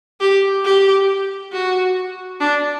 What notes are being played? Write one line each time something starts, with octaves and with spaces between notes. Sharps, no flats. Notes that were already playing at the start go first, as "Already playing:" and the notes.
G4
G4
F#4
D4